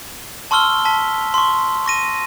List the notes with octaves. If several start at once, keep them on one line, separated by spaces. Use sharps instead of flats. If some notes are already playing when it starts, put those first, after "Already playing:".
A5 C6 C#6 E6 F6 G7
A5 B6
C6 C#6
C#6 A#6 D#7